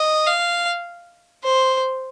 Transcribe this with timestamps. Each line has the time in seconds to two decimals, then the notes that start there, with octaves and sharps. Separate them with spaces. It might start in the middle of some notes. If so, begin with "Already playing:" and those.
Already playing: D#5
0.27 F5
1.44 C5